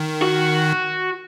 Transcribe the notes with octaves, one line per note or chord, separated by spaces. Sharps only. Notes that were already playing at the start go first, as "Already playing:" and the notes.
Already playing: D#3
F#4